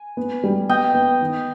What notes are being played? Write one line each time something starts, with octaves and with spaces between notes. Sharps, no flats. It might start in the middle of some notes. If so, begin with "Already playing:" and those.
Already playing: G#5
B3
G3
B3 D#5 G5
B3
D#3